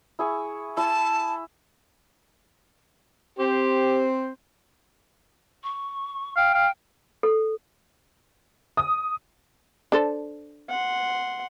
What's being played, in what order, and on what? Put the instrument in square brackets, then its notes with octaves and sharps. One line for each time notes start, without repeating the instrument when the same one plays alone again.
[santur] E4 G#4 C#6
[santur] E4 [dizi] A5
[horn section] C4 C5 [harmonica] G4
[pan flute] C#6
[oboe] F5 [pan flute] G5
[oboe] F5
[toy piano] A4
[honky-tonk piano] D#6
[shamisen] D4 A4 C5
[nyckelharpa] F#5 C6